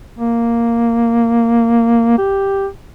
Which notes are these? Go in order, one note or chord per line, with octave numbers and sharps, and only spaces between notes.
A#3
G4